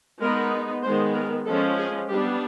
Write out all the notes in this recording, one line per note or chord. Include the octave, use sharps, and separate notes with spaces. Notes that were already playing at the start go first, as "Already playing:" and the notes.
G#3 B3 D#4 A#4
D#3 G#3 B3 C5
A#4
F3 G#3 C#4 A4
G#4
G3 B3 D4 G4